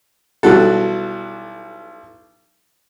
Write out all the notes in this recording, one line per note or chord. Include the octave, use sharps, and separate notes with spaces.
B1 E3 G3 F#4 A4